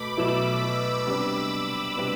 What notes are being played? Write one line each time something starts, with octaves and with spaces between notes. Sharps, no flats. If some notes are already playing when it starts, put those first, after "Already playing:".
Already playing: B2 A3 B5 D6
B2 F#3 A3 E4 E6
C3 G3 B3 D4
C3 G3 B3 D4